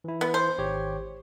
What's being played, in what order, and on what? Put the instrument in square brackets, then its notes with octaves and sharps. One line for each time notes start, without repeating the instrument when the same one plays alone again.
[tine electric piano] E3 E4
[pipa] B3
C5
[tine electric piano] G#1 G4 C#5